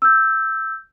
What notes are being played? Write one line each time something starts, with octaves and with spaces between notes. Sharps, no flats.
E6 G6